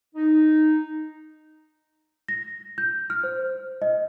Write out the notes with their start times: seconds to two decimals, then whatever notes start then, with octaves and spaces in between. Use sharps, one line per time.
0.15 D#4
2.28 A#6
2.78 G6
3.10 F6
3.24 C5
3.82 D#5